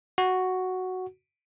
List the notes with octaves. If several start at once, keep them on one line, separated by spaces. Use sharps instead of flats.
F#4